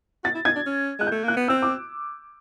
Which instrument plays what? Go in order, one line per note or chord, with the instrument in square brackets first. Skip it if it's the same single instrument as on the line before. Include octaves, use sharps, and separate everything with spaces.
[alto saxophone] F#4 [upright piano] A6
[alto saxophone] E4
[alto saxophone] D#4 [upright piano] G#6
[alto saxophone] D4
C#4
[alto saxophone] G#3 [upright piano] F#6
[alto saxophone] A3 [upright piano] G6
[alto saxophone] A#3 [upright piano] F#6
[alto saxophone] B3
[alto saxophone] C4 [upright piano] E6
[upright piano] D6